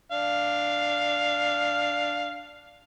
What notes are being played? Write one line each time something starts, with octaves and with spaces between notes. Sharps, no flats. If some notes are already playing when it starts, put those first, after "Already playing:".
D4 F5